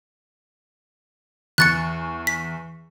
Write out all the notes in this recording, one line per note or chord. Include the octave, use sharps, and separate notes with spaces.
E2 C#6 F#6 A6 C#7
B6